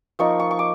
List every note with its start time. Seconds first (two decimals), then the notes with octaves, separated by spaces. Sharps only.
0.19 F3 A#3 D#4 C#6
0.40 C#6
0.51 C#6
0.59 D6